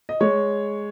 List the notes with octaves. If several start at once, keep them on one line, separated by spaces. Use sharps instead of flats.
D#5
G#3 C#5